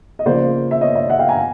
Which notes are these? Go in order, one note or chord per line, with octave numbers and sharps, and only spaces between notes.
D#5
C#3 F3 A#3 C5 D5
E5
C#5 D#5
D5 E5
E5 F#5
F5 G5
G#5 A#5